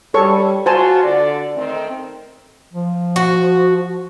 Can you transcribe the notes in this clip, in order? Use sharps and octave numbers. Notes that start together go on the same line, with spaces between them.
G3 A4 C#5 C#6
F4 F#4 C5 G#5 A5
D3 D5
D#3 A3 C4
F3
F#4